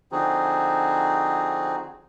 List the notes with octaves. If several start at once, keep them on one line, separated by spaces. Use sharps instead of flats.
D3 F3 C4 D#4 F#4 G#4